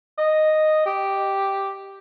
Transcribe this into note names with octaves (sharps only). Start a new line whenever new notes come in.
D#5
G4